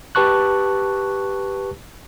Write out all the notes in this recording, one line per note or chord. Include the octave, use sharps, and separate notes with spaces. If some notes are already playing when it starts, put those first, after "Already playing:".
G4 B4 A5 C#6 F#6